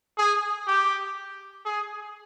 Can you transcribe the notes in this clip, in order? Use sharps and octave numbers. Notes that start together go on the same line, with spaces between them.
G#4
G4
G#4